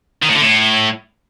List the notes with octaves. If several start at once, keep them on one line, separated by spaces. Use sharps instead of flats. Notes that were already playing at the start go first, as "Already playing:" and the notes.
D#3
A2
D3
A2